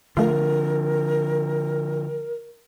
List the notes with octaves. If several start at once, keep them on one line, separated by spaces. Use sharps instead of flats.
D3 F3 A3 F4 A#4